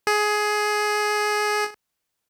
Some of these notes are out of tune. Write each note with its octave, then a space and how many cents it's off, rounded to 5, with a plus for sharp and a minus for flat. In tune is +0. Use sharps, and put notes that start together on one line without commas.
G#4 +15